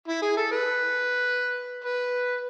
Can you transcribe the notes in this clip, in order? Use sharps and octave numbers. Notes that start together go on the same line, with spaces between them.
E4
G#4
A4
B4
B4